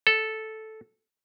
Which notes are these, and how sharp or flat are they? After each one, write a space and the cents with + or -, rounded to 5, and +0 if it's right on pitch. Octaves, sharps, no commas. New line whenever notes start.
A4 -5